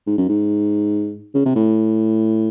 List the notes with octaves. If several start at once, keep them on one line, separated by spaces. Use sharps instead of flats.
G#2
F#2
G#2
C#3
C3
A2